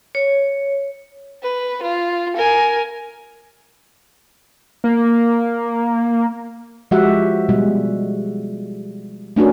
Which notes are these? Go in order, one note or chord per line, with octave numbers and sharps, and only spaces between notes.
C#5
B4
F4
A#4 G#5
A#3
F3 G#3 F#4 G4 E5 F#5
B2 G3 G#3
A3 C#4 D4 F#4 A#4